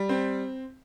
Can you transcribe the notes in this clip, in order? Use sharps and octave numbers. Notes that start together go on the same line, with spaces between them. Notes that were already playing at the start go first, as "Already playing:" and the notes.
Already playing: G3
C4